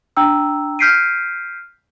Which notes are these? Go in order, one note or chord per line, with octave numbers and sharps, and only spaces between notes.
D4 G5 A#5 E6
F6 G6 B6 C7 D7 D#7